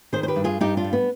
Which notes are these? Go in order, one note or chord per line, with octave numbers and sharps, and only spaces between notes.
D#3 G#4 C5
C5
G4 B4
G2
F4 G#4
G2 D#4 G4
D4 F4
G3
B3